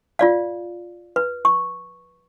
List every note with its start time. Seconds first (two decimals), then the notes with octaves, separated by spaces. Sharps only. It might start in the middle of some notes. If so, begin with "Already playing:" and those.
0.19 F4 D5 F5
1.16 B4
1.45 C#6